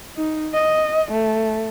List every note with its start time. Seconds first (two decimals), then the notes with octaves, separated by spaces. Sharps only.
0.17 D#4
0.54 D#5
1.12 A3